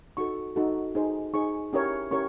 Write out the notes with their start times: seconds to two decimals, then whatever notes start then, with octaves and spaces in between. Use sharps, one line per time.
0.17 D#4 F#4 A4 C#6
0.56 D#4 F#4 A4
0.95 D#4 G#4 C5
1.34 D#4 G#4 C5 C#6
1.73 C#4 E4 G4 A#4 C#5
2.11 C#4 E4 G4 A#4 C#5 C#6